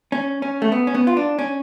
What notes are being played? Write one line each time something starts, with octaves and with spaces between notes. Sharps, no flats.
C#4
C#4
A3
B3
C#4
B3
F4
D4
C#4